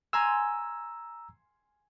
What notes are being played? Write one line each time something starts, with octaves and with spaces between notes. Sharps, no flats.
G#5 A#5 C6 E6 F6